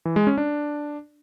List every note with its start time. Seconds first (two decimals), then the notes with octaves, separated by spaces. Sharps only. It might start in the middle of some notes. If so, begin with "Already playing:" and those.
0.05 E3
0.16 G#3
0.27 C#4
0.38 D4